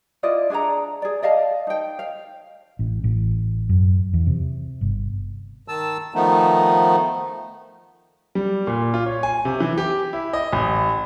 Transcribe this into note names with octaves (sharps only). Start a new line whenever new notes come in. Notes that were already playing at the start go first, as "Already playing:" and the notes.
E4 F4 D5 D#5
D4 G#4 F#5 A#5
G#4 D5
D5 D#5 F5 A5
D#4 G5
F5
A1
A1
F#2
E2
C3
G1
D#3 A5 E6
D#3 F3 A3 B3 D#4
G3
A#2
F4
C#5
G#5
C3
E3
G4
E4
D#5
A1